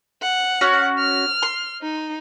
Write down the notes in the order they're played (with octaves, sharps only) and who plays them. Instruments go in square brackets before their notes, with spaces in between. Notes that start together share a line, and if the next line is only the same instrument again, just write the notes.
[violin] F#5
[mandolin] C#4 F#4
[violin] F6
[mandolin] C6
[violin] D#4